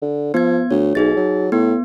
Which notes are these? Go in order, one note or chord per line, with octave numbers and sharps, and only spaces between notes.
D3
F3 B3 G#6
D2 C#5
B1 D#4 G#4 A6
F#3
A2 B3